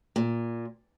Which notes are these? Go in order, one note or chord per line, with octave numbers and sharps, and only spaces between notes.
A#2